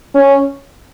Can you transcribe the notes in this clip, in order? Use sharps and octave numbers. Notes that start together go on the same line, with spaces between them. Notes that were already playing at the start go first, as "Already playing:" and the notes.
C#4